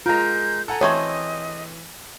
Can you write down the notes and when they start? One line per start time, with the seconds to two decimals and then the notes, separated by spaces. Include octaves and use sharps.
0.06 G#3 F4 A#4 A#5 G6
0.68 A4 F#5 G#5 A#5
0.81 E3 A3 C4 G#4 C#5 D#5